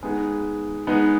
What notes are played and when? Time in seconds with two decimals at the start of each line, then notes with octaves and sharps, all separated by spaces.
0.03 G#3 B3 D#4 G#4
0.87 G#3 B3 D#4